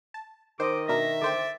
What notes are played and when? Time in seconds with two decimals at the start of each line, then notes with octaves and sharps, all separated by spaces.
0.14 A5
0.60 D#3 C5 D#5 D6
0.89 B2 D4 A#4 E5 A#6
1.22 D3 C5 G5 D6 A6